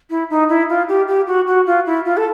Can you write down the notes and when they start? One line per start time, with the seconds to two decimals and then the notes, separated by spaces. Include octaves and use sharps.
0.10 E4
0.30 D#4
0.49 E4
0.69 F4
0.88 G4
1.08 G4
1.27 F#4
1.47 F#4
1.66 F4
1.86 E4
2.05 F4
2.17 A4